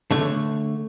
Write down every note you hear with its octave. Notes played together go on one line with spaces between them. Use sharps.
D3 A3 C#5